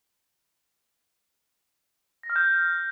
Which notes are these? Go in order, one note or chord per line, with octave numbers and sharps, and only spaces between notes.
A#6
F6
G6